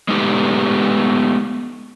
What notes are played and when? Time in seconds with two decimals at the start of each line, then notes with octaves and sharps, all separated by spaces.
0.08 G#3 A3 B3 D#4 G4